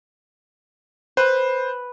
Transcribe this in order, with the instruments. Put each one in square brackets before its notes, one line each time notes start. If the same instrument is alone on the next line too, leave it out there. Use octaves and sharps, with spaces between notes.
[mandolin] B4 [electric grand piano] C5